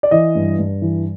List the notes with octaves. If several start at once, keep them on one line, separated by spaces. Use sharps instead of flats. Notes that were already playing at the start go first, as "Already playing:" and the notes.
D5
E3 D#5
G2
G2
E3